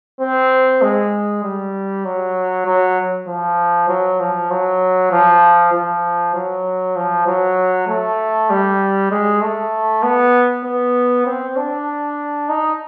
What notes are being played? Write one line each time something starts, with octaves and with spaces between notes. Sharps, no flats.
C4
G#3
G3
F#3
F#3
F3
F#3
F3
F#3
F3
F3
F#3
F3
F#3
A3
G3
G#3
A3
B3
B3
C4
D4
D#4